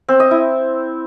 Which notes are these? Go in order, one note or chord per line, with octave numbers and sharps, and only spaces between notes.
C4
D#5
E4